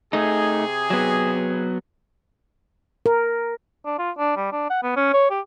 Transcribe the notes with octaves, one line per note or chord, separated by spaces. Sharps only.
C3 A3 D#4 G#4
F#3 B3
A#4
D4
F4
D4
G3
D4
F#5
B3
C#4
C#5
G4